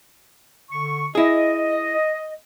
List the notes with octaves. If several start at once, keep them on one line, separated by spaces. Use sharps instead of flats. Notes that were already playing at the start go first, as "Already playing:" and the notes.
D3 C#6
E4 G#4 D#5